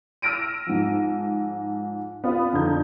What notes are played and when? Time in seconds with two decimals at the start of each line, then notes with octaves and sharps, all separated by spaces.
0.22 E6 F6 A#6 D7 D#7
0.67 G#2 F3
2.24 B3 C4 F4
2.53 F2 D3 D#4 G6